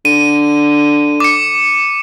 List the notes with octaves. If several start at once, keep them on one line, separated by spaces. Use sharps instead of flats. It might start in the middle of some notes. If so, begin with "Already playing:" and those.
D3 D#7
D6 C#7